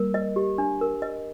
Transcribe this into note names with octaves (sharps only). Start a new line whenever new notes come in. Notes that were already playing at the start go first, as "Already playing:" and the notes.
Already playing: G3 A#3 A#4
D#5
G4
D4
A#4
D#5